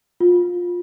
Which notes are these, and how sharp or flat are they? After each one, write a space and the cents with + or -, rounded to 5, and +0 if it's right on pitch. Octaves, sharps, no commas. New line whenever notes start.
F4 +20